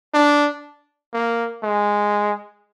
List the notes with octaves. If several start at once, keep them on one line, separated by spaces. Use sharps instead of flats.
D4
A#3
G#3